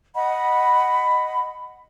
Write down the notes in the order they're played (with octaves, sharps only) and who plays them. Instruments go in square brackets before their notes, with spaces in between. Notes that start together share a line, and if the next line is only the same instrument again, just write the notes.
[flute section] D#5 F#5 B5